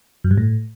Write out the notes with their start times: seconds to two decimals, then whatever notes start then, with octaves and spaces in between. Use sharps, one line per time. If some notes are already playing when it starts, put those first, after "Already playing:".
0.24 F#2
0.31 G2
0.38 A2